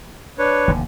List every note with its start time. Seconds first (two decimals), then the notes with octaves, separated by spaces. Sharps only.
0.38 D4 B4 C#5
0.68 F1 D#2 D3